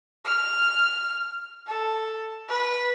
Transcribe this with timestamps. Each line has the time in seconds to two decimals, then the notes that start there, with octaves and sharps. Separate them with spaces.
0.25 F6
1.67 A4
2.49 B4